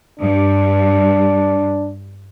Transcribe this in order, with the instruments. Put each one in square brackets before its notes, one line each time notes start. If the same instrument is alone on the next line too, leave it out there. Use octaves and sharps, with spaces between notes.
[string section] G2 [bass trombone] D4